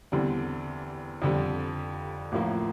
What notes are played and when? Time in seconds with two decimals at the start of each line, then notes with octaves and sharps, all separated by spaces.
0.12 E2 D3 G3 C4
1.22 F2 D3 G3
2.32 A1 A2 F3 A#3